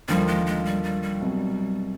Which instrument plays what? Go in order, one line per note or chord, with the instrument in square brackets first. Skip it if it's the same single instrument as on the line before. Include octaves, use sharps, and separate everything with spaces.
[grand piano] D#2 D3 F3 A#3 [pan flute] G3
[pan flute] G#3
G#3
G3
G3
G3
[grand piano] C2 B2 F#3